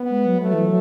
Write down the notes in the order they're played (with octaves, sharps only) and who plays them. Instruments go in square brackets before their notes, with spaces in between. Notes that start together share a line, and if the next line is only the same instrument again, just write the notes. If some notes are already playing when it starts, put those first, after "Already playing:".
Already playing: [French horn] B3
[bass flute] G#3
F#3
[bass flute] F#3 [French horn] A3
[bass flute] E3
F#3